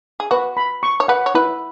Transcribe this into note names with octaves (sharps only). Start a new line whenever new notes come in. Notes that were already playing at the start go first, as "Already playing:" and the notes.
G#4
F#4 B4
B5
C#6
C#5
B4 F#5
C#5
E4 B4